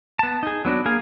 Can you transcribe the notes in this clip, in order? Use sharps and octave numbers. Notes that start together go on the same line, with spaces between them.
B3 A5
D#4 G#4
F#3 B3 D4 F#4
A#3 G#4 F5 G#5